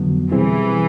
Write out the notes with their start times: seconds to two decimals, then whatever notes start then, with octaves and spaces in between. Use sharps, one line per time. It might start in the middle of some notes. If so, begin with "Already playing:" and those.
Already playing: F2 D3 F#3 B3
0.32 B2 E3 G3 C4 E4 G#4